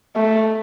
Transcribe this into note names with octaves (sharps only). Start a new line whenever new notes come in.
A3